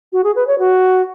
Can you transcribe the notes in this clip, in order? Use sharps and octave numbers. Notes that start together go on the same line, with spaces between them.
F#4
G#4
B4
C#5
F#4